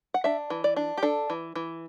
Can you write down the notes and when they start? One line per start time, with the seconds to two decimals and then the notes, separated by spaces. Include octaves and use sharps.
0.14 F#5
0.24 D4 E5
0.50 E3
0.64 D5
0.76 D4
0.98 G4
1.03 D4 A4
1.30 E3
1.56 E3